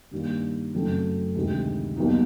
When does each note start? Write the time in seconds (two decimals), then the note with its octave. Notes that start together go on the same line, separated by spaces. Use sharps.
0.11 G2 D#3 G3 A#3
0.74 F#2 C#3 F#3 A3 C4
1.35 D2 C3 D#3 G#3
1.97 B1 B2 G3 A#3 D#4